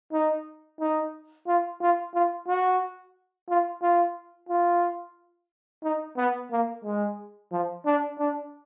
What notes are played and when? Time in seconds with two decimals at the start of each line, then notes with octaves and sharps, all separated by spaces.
0.13 D#4
0.80 D#4
1.47 F4
1.81 F4
2.14 F4
2.48 F#4
3.49 F4
3.82 F4
4.49 F4
5.83 D#4
6.17 B3
6.51 A#3
6.84 G#3
7.52 F3
7.86 D4
8.19 D4